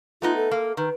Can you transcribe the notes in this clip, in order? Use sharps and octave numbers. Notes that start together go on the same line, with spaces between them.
A3 B3 D#4 F4
A4
A#3
D#3 B4